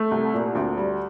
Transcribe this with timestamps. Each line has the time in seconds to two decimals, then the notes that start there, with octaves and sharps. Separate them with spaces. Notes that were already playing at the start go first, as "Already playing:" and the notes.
Already playing: A3
0.11 C2
0.34 A#2
0.55 D2
0.77 G3